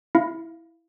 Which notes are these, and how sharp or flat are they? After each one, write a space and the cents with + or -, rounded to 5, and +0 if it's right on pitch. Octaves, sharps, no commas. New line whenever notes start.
E4 +0 F5 -15